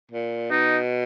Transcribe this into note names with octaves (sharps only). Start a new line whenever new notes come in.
A#2
B2 D#4